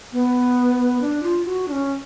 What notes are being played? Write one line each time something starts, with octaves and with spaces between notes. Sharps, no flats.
B3
D4
F4
F#4
D4
C#4